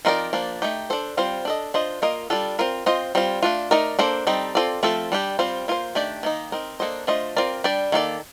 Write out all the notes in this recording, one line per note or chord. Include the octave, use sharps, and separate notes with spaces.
F3 C4 D#4 A#4 D5
F3 A#3 D4
A3 D#4 G4
D4 A4 C5
G3 C4 F4 C5
D4 A4 D#5
D4 F4 C5 D#5
A#3 F4 A#4 D#5
G3 D4 F4 A4
C4 F4 A#4
C4 F4 C5 D#5
G3 C4 F4
A3 D4 F4
A3 D#4 A#4 D5
A#3 D4 A4 C5
G3 C4 D#4 A4
C4 F4 A4 D5
F3 A3 C4 F4 A4
G3 D4 G4
G3 C4 F4 C5
A#3 F4 C5
D#3 A3 D4 G4 D5
D#3 A#3 D#4
C4 D#4 A#4
A#3 D4 A4 C5 D#5
A3 D4 F4 C5 D#5
C4 F4 A#4 D5
G3 D4 G4 D5
D#3 A#3 D4 A4 D5